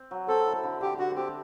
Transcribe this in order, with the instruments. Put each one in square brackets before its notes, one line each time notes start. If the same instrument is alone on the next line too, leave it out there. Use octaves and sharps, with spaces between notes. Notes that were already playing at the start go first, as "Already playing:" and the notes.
Already playing: [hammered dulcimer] C4
F#3
[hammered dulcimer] C4 [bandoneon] A4
[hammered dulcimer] E4
D3
[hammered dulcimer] D3 [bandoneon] G4
[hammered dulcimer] D3 [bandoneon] F#4
[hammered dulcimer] C4 [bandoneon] G4